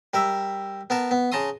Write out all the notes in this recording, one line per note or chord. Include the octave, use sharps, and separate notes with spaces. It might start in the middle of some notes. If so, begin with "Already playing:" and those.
G3 A#4 E5
B3 A#4 A5
B3
C#3 A5 A#5 C6 D#6